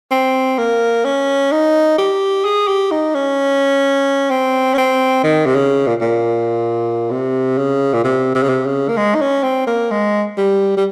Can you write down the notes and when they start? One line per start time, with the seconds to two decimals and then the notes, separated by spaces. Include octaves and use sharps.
0.11 C4
0.58 A#3
1.05 C#4
1.52 D#4
1.98 G4
2.44 G#4
2.68 G4
2.91 D#4
3.14 C#4
4.30 C4
4.74 C#4
4.78 C4
5.23 D#3
5.46 C3
5.55 C#3
5.87 A#2
6.01 A#2
7.10 C3
7.57 C#3
7.93 A#2
8.04 C3
8.35 C3
8.43 C#3
8.49 C3
8.66 C#3
8.89 A#3
8.97 G#3
9.15 D#4
9.21 C#4
9.43 C4
9.67 A#3
9.91 G#3
10.37 G3
10.77 G3